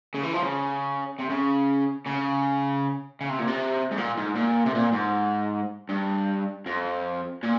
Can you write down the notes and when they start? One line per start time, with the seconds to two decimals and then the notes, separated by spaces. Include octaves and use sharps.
0.15 C#3
0.23 E3
0.33 F3
0.43 C#3
1.19 C3
1.30 C#3
2.06 C#3
3.21 C#3
3.30 C3
3.39 A#2
3.48 C3
3.91 G#2
3.97 A#2
4.17 G#2
4.35 A#2
4.66 C3
4.75 A#2
4.93 G#2
5.89 G2
6.66 F2
7.43 A#2